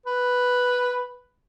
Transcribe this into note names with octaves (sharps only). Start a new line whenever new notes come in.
B4